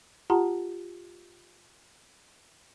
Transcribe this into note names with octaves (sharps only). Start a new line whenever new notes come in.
F4 G4 F#5 A5 A#5 C6